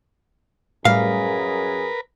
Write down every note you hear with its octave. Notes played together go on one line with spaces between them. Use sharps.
F#2 A2 G3 G#4 A#4 B4 F5